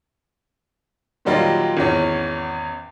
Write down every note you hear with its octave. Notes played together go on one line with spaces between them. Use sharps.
A#2 D#3 F#3 G3 A#3 F4
G#1 E2 C#4